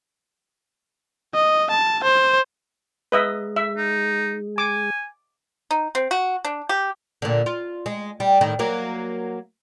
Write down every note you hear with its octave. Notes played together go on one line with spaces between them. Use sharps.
D#5
A5
C5
G#3 B4 D#5 E5
E5
D#4
G#5 D6
D#4
C4
F#4
D4
G4
A#2 D3
F4
G#3
G3
A2 D#3
F#3 A#3